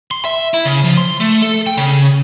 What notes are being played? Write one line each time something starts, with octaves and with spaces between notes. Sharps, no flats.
C6
E5
E4
C#3
F3
C6
A3
A4
G5
C#3